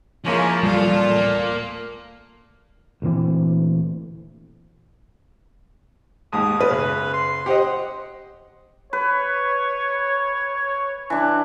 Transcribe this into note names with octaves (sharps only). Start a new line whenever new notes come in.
F3 G#3 A#3 C#4 E4
D1 A1 A#2 G3 F4 A4
A#3
D2 A#2 E3 C4
D#2 G#2 D#6
B1 B4
F#1 B4
C6
G4 C5 D#5 F#5
B4 C#5
E3 D4